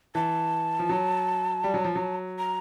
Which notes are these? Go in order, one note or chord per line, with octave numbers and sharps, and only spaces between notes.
E3 A5
F3
F#3
G3
F#3
F3
F#3
A#5